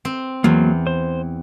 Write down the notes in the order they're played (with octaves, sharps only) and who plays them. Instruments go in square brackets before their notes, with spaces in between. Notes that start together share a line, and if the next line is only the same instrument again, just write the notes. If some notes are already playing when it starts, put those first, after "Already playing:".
[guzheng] C4
[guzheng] E2 [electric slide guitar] F#3 A#3
[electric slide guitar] C5